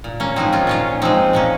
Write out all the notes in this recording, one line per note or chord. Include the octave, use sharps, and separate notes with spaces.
A#2
A#3 C#4
F3 G#3 C4 D#4
C#4 F4
A#2 C#4 F4
F3 G#3 C4 D#4
A#2 A#3 C#4